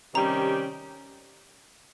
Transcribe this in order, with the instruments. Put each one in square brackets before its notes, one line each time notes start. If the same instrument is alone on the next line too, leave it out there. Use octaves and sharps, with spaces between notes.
[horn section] C3 D#3 G3 C#4 G4 [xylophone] A#5